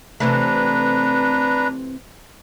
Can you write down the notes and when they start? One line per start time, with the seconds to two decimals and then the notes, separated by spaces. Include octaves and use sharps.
0.20 C3 E3 A3 D4 B4 A#5